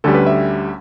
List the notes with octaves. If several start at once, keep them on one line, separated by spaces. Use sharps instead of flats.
D2 D3 G3 C#4 A4
B4
E5